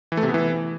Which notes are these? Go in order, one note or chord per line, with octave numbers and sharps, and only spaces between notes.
E3
A3
C3
B3
E3